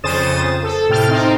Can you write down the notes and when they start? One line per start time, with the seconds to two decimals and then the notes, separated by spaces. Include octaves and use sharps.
0.04 F2 C#3 C5 D#6 A6 E7
0.63 A4
0.89 A2 C3 G5 F6 A6
1.09 C4 D#4 C5